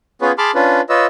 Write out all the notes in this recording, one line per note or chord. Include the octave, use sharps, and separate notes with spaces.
B3 C#4 F4 G#4 B4 C#5
G#4 A5 B5 C6 D6 F6
C#4 D4 F4 B4
F4 B4 C#5 D#5 E6